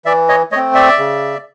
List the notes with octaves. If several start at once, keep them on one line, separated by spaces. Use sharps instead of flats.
E3 D5 E5
C#5 D#5
A3 C4 C#5 D#5
D5 E5
C#3